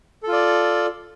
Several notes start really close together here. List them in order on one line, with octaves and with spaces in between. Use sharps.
A4 F4 D5